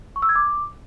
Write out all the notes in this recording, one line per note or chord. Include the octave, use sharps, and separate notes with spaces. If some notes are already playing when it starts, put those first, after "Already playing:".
C#6
E6
G#6
D6